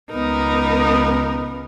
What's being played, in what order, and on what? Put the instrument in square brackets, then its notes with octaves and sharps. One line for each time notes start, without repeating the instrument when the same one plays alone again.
[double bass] C#2 B3 [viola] D#4 A#4